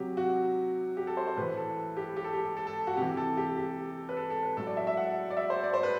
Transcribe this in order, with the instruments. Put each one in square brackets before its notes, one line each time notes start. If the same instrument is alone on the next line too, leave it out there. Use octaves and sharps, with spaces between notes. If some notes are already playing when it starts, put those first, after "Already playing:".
Already playing: [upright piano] C3 F#3 G4
F#4
G4
A4
C5
C5
A2 E3 B4
A4
G4
G4
A4
G4
A4
A4
F#4
C3 E3 G4
A4
G4
G4
B4
A4
A4
B4
A2 F#3 A4
D5
E5
E5
F#5
D5
E5
C5
D5
C5
B4